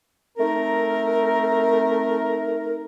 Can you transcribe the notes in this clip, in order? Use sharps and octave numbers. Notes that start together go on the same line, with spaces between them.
A3 C4 D#4 A#4